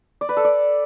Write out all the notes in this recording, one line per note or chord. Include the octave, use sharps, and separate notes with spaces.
D5
B4
A4
D5